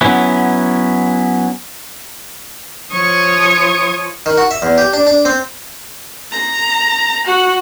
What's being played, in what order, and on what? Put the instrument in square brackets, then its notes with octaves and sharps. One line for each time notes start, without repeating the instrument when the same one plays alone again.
[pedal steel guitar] F#3 B3 C#4 E4
[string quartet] F3 C#5 C#6 D#6
[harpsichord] D#3
F#4
E5
E2
G4
D4
D4
C4
[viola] A#5
F#4 F#5